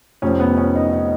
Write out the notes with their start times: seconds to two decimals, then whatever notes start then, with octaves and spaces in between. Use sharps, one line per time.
0.22 F1 F2 F3 C#4
0.40 B3
0.57 C#4
0.75 D#4
0.92 D#4